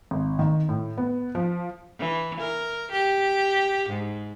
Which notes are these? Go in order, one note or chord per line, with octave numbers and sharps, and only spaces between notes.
G#1
D#3
A2
B3
F3
E3
A#4
G4
G#2